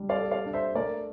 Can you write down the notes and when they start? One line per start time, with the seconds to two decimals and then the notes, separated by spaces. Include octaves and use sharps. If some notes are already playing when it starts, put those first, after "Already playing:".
Already playing: G3 D4
0.09 D5 F5
0.17 A4
0.31 D5 F5
0.46 D4
0.53 C5 E5
0.75 A3 A#4 D5